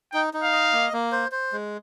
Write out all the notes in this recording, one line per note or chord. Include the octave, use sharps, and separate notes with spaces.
D#4 G5
D#4
F5
D#5
A#3
A#3
C5
C5
G#3